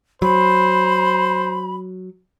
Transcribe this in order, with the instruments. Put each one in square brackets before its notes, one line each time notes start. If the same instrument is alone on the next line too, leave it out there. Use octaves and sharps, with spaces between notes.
[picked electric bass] F#3 [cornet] C5 [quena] B5